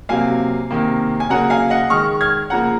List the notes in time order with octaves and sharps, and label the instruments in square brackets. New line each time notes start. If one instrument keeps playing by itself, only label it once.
[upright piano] C3 F#3 A#3 F5 G#5
C3 D#3 A#3
G#5
C#3 F#3 A#3 F#5 A#5
F5 G#5
D#5 F#5
D#3 G#3 C#6 F6
F6 G#6
C#3 F3 A#3 F#5 A#5